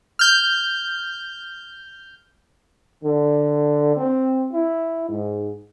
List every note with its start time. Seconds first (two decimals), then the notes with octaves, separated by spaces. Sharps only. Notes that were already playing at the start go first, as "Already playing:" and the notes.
0.19 F6 G6
3.03 D3
3.97 C4
4.53 E4
5.08 G#2